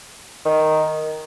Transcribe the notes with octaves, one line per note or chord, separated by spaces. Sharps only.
D#3